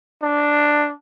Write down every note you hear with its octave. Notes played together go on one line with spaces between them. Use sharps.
D4